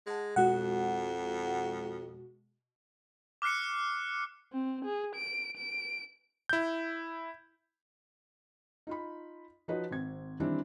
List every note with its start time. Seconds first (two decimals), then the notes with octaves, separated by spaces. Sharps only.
0.07 G#3 F#5 A5
0.36 F2 B2 G#3 F#4 F#5
3.42 D6 F6 F#6 C7 C#7
4.53 C4
4.85 G#4
5.16 D7
5.57 D7
6.49 E4 G6
8.87 D#4 F4 B5
9.68 F3 D#4 F#4 B4 C#5 D#5
9.91 G#1 C4 G#6
10.40 D#3 E3 G3 C4 D4 E4